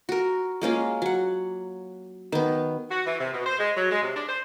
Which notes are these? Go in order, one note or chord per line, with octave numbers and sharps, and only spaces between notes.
F#4 A#4
G#3 A#3 C#4 F4
F#3 F#5
D#3 B3
F#4
E3
C3
B2
C5
G#3
F#3
G#3
C3
D4
C5